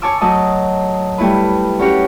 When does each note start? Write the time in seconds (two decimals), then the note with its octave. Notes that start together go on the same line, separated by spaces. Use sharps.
0.02 C#5 G#5 A5 D6 E6
0.21 F#3 A3 D#5 A5
1.18 G3 A3 E4 B4
1.79 C#4 F#4 G4 C#5